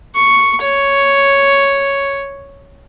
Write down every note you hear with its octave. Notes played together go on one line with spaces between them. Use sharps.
C#6
C#5